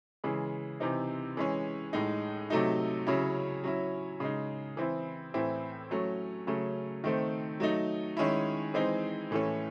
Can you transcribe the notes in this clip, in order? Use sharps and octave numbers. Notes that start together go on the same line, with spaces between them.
C#3 E3 G#3
C3 E3 C4 D#4
E3 G#3 C#4
A2 G#3 D#4
C3 F#3 A3 D#4
C#3 F#3 C#4 E4
F#3 C#4 E4
C#3 G#3 D#4
E3 C4 E4
A2 E3 C4 E4
F#3 A3 C#4
C#3 F#3 A3 C#4
D#3 A3 C4
F#3 A3 D#4
D#3 G#3 C#4 E4
E3 G#3 C4 D#4
A2 E3 A3 C#4